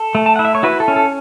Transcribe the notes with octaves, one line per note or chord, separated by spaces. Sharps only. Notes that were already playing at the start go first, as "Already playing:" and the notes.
Already playing: A4
A3
A5
E4 F#5
E5
C#5
E4 F#4 B4
A4
C#4
A4